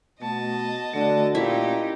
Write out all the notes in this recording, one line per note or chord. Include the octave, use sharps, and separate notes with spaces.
B2 A3 D#5 A5
D3 A3 F#4 D5
A#2 C#4 D#4 E4 G4